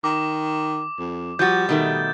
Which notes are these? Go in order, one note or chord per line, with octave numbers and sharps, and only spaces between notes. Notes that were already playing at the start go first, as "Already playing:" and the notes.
D#3 D6
F2
F3 G3 F#4 G6 A6
B2 D#3 A3